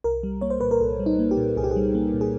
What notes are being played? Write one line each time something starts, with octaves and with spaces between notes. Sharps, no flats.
C2 A#4
G3
A#3 C#5
C5
A#2 B4
A#4
C2 A4
G3
D#4
A#3
G4
A#2
C2 G#4
G4
G3 G#4
A#3
A#2
G#4